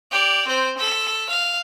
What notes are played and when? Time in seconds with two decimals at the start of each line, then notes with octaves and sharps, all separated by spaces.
0.11 G4 D5
0.47 C4 C5
0.78 A4 B6
1.30 F5